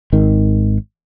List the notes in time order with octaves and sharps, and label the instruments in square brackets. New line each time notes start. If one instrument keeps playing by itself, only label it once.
[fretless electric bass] G#1 D#3